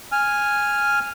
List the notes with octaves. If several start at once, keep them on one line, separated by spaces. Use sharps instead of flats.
G#5 F6